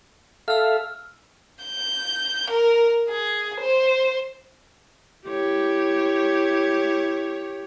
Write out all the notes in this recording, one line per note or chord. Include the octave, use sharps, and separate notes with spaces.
A4 E5 F5 E6 F6
G6
A#4
G#4
C5
E4 G4 C#5